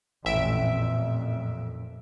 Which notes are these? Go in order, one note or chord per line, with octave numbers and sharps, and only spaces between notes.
A1 F2 A#2 E5 D7